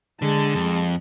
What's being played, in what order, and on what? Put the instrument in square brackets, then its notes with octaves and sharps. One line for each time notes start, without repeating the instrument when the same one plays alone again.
[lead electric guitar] D3 [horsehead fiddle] G#3 A5
[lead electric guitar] F2